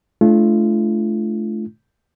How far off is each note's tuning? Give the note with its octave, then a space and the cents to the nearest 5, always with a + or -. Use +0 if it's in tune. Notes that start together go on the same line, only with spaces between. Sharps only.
A3 -30 D4 +0 F4 -35